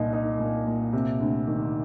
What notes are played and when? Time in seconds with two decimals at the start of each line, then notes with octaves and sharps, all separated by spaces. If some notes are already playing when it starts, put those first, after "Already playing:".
Already playing: C2 A#2 D#4
0.13 D#4
0.39 A#2
0.66 A#2
0.93 C3
1.20 D2
1.47 D#3